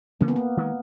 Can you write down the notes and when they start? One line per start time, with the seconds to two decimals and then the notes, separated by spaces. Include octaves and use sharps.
0.21 C#3 E3 G3 A#3 C#4
0.28 B3
0.36 A#3
0.57 D#3 G#3 B3